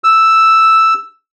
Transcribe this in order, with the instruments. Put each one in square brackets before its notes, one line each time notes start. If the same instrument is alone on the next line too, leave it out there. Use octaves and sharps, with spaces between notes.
[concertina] E6